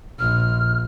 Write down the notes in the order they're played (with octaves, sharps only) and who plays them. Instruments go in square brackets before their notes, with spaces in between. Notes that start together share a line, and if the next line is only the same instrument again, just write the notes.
[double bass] A#1 [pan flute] F6